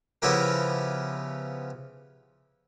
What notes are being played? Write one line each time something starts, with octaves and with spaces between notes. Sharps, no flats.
C#3 F3 B3 E4 G4 A#4